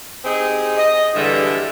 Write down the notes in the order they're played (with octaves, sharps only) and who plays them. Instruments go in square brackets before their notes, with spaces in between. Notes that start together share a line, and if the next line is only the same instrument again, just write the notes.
[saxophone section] C4 D#4 G4 G#4
D#5
E2 G2 D3 G3 G#3 E5